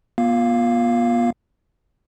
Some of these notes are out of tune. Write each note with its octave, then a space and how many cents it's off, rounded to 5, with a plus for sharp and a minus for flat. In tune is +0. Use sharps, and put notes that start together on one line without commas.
B3 -45 F4 +15 F5 +0